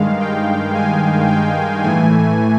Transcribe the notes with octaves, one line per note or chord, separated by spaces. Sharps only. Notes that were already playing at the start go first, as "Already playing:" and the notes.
Already playing: G2 D#3 G#3 F5
G5
G#5
G5
A2 E3 A3 G#5